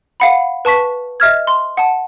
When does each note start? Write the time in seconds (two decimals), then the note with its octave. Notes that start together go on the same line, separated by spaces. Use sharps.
0.20 F5 F#5 B5
0.65 B4 A5 C#6 B6
1.20 D#5 E5 F6 G#6
1.47 C6
1.77 F#5 A5